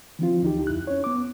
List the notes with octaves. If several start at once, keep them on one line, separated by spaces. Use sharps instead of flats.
E3 F3 C4 F4
D2 D#4 G4
F2 E4 F#6
C#4 C#5
B3 D6